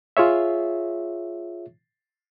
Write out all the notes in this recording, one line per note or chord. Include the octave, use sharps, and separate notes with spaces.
F4 G#4 C#5 E5